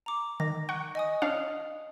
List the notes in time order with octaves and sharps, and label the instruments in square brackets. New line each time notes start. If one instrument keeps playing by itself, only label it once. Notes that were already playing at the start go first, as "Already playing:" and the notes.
[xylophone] A#5 D6
[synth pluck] D#3 [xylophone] A#6
[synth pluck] F#5 [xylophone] C#6
[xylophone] D#5 G#5 D#6
[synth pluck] C#4 D4 F5 [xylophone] F7